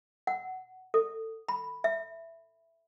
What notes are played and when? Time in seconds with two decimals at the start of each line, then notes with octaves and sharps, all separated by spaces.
0.27 F#5
0.94 A4
1.48 B5
1.84 E5